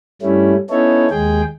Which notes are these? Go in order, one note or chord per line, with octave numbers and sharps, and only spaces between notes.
G2 G3 A3 C#4 E4
B3 C#4 D#4 E4 A4 C#5
D#2 G#3 G#4 G5